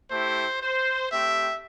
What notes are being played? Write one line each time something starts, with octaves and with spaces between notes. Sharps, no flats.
A3 E4 G4 C5
C5
A3 C4 G4 E5